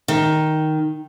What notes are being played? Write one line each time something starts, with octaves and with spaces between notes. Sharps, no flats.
D#3